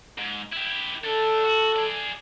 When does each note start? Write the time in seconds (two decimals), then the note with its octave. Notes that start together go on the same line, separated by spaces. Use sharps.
0.18 G#2
0.53 E4 G4
1.04 A3 D4 A4
1.44 F#4
1.76 G#4 D5